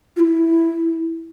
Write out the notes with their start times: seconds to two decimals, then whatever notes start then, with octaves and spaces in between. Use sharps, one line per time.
0.17 F4
0.20 E4